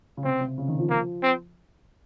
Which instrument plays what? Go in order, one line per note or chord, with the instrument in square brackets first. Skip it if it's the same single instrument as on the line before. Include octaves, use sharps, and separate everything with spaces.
[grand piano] C#3
[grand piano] C3 [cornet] C4
[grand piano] C3
C#3
D#3
F3
[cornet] A#3
C4